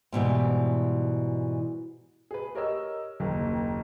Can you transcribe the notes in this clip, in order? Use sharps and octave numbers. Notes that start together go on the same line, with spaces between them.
G#2 B2 E3 G3
G#4 B4
G4 A#4 C#5 D#5 E6
F#1 D#2 A#3